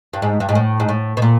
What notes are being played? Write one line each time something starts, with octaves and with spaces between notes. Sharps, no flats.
G2
G#2
G2
G#2
A2
G#2
A2
B2
A#2